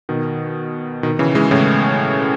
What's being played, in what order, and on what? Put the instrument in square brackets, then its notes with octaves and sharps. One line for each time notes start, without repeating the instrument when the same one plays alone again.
[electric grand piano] B2 D#3
B2 D#3
C#3 E3
E3 G#3
A2 C#3